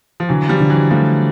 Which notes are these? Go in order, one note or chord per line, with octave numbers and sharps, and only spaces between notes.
F3
D3 E3 F#3
F3 G3
D3
E3 F#3
F3 G3 A3